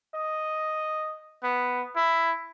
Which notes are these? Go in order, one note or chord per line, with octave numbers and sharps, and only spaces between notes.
D#5
B3
E4